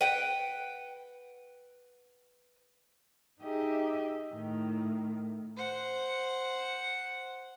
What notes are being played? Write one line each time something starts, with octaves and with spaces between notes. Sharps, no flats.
B4 F#5 G5
D#4 G4 G#4 D#5 E5
A2 D#3
C5 F#5